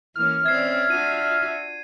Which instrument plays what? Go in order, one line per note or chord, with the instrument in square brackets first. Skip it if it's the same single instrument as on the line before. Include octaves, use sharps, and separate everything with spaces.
[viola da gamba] E3 A#3 C#4 [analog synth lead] F6
[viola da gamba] C4 C#4 D5 [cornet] E5 [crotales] G#6 C7
[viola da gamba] D4 F4 F#4 [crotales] D#7